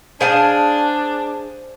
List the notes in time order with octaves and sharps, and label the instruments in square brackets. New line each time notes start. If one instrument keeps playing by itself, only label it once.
[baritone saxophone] D4 [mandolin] G#4 [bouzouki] C5 F5 A5